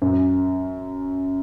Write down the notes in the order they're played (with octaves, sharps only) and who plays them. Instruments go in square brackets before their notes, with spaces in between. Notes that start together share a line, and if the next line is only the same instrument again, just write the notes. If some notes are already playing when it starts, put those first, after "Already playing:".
[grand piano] F#2